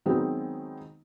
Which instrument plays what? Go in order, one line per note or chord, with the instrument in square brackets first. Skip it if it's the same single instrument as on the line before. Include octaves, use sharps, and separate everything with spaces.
[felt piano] D#3 F#3 G#3 B3 C4 D#4